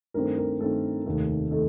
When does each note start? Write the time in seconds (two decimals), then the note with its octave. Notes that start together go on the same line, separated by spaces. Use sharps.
0.14 G2 D#3 A3 C4 A#4
0.38 A#4
0.60 G2 D#3 A3 C4 A4
1.06 F1 D#2 D#3 A3
1.51 D#3 A3 A4